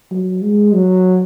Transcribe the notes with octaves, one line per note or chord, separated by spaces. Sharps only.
F#3
G#3
F#3